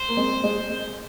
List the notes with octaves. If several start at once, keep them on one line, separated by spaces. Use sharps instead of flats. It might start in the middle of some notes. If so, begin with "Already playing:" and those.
Already playing: C5
A#3
G#3 C4
G#3